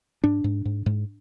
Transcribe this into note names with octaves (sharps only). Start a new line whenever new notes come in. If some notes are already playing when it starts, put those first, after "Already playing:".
G#2 D4
G#2
G#2
G#2